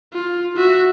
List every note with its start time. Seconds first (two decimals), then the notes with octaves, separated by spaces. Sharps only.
0.13 F4
0.56 F#4 E5